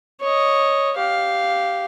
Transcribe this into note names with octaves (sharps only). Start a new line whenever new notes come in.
C#5 D#5
G4 F5